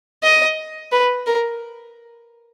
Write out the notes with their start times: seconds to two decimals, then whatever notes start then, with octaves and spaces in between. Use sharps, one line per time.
0.23 D#5
0.92 B4
1.27 A#4